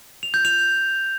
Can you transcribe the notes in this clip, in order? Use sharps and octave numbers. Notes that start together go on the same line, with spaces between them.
F7
G6
F7